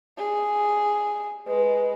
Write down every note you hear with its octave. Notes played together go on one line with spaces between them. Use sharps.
G#4
G#3 B4